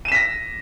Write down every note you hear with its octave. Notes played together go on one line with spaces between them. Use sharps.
A#6 B6 D#7 E7